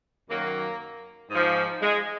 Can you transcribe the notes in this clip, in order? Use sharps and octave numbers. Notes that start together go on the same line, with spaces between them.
F#2 D#3 F#3 A#3
G#2 F3
G#3